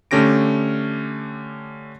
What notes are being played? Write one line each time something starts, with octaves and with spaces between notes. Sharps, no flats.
D3 A3 C#4 G4 A#6 D7